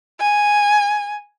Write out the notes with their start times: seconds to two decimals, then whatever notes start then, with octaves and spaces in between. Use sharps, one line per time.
0.20 G#5